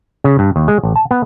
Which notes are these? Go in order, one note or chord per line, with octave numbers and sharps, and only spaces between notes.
C#3
G2
D#2
G#3
A1
A5
B3